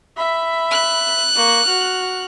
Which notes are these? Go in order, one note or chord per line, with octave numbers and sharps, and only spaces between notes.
E5 B5
F#6
A#3 C#6
F#4 F6